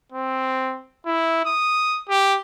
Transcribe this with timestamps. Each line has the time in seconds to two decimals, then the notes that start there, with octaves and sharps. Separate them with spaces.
0.12 C4
1.06 E4
1.46 D#6
2.09 G4